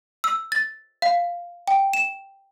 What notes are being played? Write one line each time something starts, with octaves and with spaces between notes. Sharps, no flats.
E6
A6
F5
G5
E7